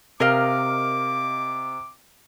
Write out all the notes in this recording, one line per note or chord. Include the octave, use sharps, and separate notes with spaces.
C3 A#4 D#5 F5 D6